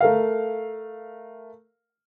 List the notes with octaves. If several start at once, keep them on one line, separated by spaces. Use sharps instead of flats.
A3 A#4 F5